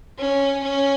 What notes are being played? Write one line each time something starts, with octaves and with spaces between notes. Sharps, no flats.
C#4
C#4